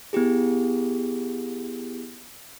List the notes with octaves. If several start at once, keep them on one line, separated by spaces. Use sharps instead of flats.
B3 E4 G4 G#4